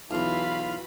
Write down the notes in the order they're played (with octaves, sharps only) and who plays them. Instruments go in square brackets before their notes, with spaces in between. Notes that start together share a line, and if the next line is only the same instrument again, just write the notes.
[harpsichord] B1 E2 [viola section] E3 F#4 B5 [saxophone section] F4 F5